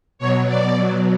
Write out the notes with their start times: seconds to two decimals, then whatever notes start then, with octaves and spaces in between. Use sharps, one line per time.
0.19 B2 F#3 C#5
0.47 B2 F#3 D5
0.76 B2 F#3